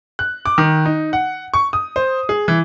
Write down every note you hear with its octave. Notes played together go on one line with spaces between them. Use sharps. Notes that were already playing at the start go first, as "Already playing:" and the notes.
F#6
D6
D#3
D#4
F#5
C#6
D#6
C5
G#4
E3